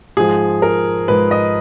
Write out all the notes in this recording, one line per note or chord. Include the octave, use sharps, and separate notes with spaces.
G#2 F3 G#4
A#4
G#2 F3 B4
D#5